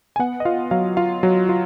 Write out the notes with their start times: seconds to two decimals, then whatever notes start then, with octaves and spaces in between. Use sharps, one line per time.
0.16 G#5
0.19 B3 F#5
0.40 D#5
0.45 F4 F5
0.71 F#3 F5
0.97 F4 F5
1.23 F#3
1.49 F4